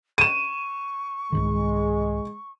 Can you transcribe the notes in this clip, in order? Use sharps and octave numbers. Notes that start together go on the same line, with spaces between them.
C#6 D#7 E7
C2 G#2 D#3 G#3